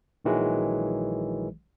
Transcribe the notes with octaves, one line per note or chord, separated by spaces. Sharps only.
A#1 D#3 E3 F#3 G#3